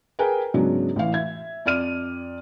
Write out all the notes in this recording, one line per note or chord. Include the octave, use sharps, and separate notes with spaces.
G#4 A#4 B4 G5 G#5
G#2 C#3 F#3 B3 D4
A1 E3 F5
E5 G#6
F2 D5 F6 D#7